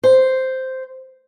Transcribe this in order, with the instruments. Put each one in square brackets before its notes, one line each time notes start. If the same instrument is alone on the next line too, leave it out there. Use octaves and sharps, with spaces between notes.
[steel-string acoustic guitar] C5